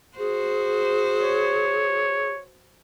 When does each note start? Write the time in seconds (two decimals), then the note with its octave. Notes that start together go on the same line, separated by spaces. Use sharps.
0.18 F#4 G#4 C5
1.22 C#5